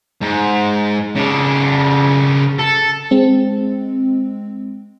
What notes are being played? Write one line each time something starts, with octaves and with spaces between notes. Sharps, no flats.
G#2
C#3 D4
A4
G#3 C4